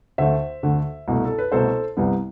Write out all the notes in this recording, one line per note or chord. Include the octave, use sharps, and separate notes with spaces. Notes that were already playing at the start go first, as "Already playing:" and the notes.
D2 D3 A3 C5 E5
D2 D3 A3
C2 B2 A3
A4
B4
C2 B2 A3 A4 C5
C2 C3 G3 B3